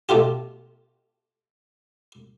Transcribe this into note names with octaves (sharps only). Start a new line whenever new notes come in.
B2 A3 F4 G4